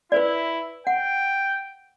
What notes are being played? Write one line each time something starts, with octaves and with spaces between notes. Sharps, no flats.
E4 B4 C5 D5
F#5 G5